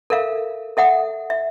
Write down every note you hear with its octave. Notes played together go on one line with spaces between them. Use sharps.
A4 A#4 E5 F5
A4 E5 F#5 D#6
E5